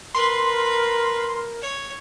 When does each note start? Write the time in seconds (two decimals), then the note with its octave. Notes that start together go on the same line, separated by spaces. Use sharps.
0.15 A#4 B4 C6
1.62 C#5